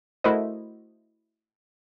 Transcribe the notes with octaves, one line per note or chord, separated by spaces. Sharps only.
A3 E4 F#4 A#4 C5 D#5